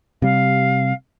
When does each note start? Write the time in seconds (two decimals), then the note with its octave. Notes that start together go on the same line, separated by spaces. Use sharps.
0.22 C3 G3 F5